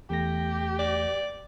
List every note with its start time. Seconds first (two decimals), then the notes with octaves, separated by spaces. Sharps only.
0.10 E2 A3 G4 A#6
0.79 D5